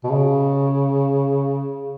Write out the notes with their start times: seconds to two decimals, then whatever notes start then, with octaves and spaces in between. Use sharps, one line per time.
0.04 B2
0.10 C#3